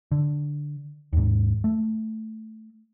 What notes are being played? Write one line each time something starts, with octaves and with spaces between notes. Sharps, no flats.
D3
D#2 G#2
A3